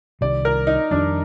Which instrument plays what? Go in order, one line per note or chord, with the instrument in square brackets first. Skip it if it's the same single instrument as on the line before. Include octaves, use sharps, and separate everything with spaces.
[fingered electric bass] C2 C3 D#3 G3 [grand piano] D5
[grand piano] A#4
D#4
[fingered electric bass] F2 D#3 G3 [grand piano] D4